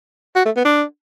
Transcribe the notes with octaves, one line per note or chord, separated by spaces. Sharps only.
F#4
A3
B3
D4